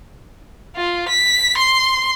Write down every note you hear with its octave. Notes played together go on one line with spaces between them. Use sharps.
F4
B6
C6